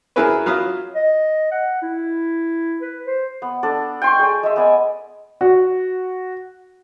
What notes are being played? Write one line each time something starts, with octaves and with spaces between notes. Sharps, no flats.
F#2 E4 G#4 A#4 B4 C#5
F#3 F4 F5 B5 D#6
D#5
F#5
E4
B4
C5
B3
D4 A4 D5
G5 C6 C#6
G#4 D5
G#3 E5
B3 D5 G#5
F#4